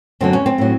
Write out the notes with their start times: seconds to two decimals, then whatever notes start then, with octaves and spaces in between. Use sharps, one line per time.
0.21 F#2 D3 F#3 C4
0.33 C#4
0.46 C4
0.58 A2 F#3